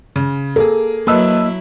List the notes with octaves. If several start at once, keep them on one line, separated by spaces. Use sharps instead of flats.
C#3
A#3 G#4 A4
F#3 A#3 E4 B4 D#5 A5 E6